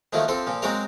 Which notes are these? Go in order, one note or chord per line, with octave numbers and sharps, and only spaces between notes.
D#3 F3 F#3 A3 A#3
F3 C4 A4 C6
A#2 F3
F#3 G#3 C4 F#4 A#4 F5